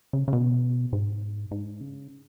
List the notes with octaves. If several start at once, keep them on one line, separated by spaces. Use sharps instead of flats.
C#3
C#3
B2
G#2
G#2
C#3